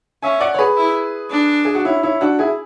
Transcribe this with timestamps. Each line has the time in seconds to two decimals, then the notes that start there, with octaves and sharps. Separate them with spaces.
0.22 C#4 E5 G#5
0.41 D5 F#5
0.54 C#5
0.59 G#4 B4
0.77 E4
1.31 D4
1.65 G#4
1.75 F#4
1.85 C#4 E4
2.03 C#4 E4
2.21 D4 F#4
2.39 E4 G#4